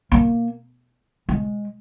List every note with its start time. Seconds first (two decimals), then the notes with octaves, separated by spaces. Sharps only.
0.12 A#3
1.29 G#3